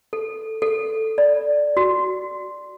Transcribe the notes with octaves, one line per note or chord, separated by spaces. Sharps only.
A4
A4
D5
F#4